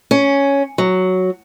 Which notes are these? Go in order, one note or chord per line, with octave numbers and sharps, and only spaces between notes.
C#4
F#3